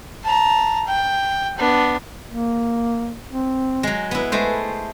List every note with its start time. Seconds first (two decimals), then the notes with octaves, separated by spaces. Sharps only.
0.23 A5 A#5
0.86 G5
1.58 B3 D4
2.28 A#3
3.30 C4
3.83 F#3 G#3
4.11 B3 E4 B4
4.32 G#3 A3 C5